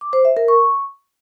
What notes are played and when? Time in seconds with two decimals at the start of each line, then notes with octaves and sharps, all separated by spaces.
0.01 D6
0.13 C5
0.25 E5
0.37 A#4
0.48 C#6